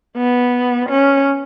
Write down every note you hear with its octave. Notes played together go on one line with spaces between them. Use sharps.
B3
C#4